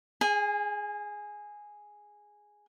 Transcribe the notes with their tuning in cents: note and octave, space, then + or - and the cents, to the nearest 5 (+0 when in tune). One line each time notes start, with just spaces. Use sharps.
G#4 +0 G#5 -35